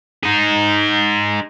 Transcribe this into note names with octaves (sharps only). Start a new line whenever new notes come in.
D#4 G#4